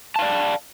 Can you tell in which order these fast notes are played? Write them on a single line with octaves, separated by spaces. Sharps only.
A5 F5 D5